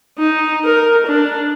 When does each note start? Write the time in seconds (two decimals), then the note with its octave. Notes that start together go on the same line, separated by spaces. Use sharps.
0.18 D#4
0.64 A#4
1.07 D4